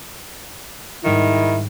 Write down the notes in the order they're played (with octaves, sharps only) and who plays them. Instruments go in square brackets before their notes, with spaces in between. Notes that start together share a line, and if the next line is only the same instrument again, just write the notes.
[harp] G#2 G3 C#7 [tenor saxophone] D#3 [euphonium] E4